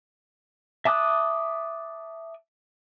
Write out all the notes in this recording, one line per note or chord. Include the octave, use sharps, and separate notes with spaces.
E5 A5 D6 D#6 F#6